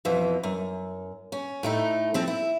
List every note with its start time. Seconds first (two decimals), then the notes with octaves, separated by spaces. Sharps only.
0.05 F2 B2 E3
0.43 F#2
1.32 C#4
1.63 A2 A3 D#4
2.14 F3 C4 A4
2.28 E4